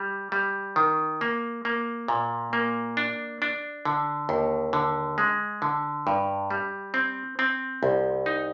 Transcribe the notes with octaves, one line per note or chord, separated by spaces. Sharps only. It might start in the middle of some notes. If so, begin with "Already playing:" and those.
Already playing: G3
G3
D#3
A#3
A#3
A#2
A#3
D4
D4
D3
D#2
D3
G#3
D3
G2
G3
C4
C4
C2
D#4